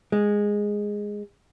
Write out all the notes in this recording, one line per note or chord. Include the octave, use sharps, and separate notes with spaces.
G#3